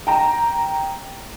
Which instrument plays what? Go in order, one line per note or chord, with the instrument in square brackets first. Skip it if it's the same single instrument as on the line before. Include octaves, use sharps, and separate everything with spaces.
[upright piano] G5 A#5